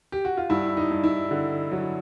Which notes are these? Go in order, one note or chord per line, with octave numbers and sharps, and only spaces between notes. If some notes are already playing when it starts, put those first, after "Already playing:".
G4
F#4
F4
G2 E4
D#4
G2
E4
D3
F#3